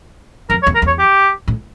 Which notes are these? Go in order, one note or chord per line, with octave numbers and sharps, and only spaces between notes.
F2 A#4
C#5
E2
A#4
E2
C#5
G4
A2